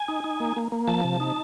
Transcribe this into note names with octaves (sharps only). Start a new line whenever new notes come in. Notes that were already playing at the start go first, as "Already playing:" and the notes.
Already playing: G#5
D#4
D#4
A#3
A#3
A#3
F3 A5
C3
D#4